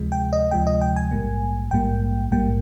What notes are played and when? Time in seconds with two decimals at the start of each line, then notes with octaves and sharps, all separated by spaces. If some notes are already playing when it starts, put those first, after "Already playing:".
Already playing: D2 C3 F3 G#3
0.12 G5
0.33 D#5
0.51 D2 C3 F3 G#3 G5
0.67 D#5
0.81 G5
0.96 G#5
1.11 A#1 G#2 G3 A#3
1.71 A#1 G#2 G3 A#3 G5
2.31 A#1 G#2 G3 A#3 G5